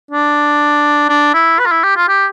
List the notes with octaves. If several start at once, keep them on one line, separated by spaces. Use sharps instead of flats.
D4
D4
E4
B4
F4
E4
G4
F4
G4